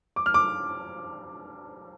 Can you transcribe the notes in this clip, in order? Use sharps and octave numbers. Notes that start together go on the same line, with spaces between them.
D6
F6
D6